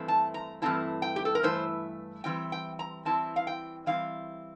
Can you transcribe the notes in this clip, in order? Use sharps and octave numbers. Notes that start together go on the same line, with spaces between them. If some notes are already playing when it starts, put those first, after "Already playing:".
Already playing: G2 E3 A3 C4 E4
A5
A#5
G2 E3 A3 C4 E4 A5
G5
G4
A4
A#4
G2 E3 A3 E4 C5
E3 G3 C4 E4 G5
G5
A#5
E3 G3 C4 E4 A5
F5
G5
E3 G3 C4 E4 F5